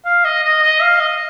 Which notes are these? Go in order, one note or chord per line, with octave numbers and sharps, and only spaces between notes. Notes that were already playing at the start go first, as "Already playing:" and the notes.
F5
D#5
D#5
D#5
F5
D#5